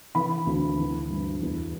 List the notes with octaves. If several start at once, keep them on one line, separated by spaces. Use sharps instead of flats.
E3 B5
D2
E3
G2
E2